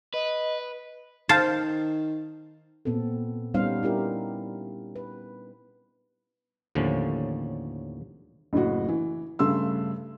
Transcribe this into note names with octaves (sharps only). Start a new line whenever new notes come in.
B4 D#5
D#3 C5 F5 A5
A#2 B3 C4 A4
G3 B3 C#4 D#4 C5 F5
D4 E4 G4 A#4
B4
D#2 A2 D3 F3 C#4
F#1 A2 F#4
E3
G2 C#3 A3 C6 E6